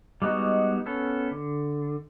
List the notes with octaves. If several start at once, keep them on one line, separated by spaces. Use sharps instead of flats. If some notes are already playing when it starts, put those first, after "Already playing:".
G3 G#3 B3 D#4 F#4
B3 C#4 A4
D3